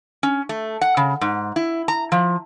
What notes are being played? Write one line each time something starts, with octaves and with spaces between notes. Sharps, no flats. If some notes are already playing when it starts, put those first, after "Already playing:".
C#4
A3
F#5
C#3
G#2
E4
A#5
F3